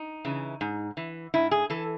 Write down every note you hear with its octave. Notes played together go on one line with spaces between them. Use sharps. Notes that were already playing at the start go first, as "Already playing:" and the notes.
Already playing: D#4
C#3 E3
G#2
E3
G#2 E4
G#4
E3 A4